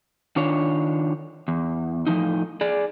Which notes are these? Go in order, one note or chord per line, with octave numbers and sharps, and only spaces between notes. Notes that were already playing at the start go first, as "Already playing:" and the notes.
D#3 D4 F4 C#5
E2
A2 F3 C#4 D#4
G#4 D5